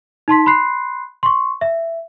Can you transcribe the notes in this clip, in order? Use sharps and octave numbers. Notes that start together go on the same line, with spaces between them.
D#4 A5 C6 B6
B5 C6 F#6 C7
C6 C#6
E5